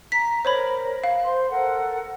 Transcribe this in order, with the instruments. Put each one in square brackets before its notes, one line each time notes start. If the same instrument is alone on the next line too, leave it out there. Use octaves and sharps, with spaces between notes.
[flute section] A#5 [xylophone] B6
[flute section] A#4 [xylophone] C5 C#5 B5
[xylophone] F5
[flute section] C5 C6
A4 A#4 F#5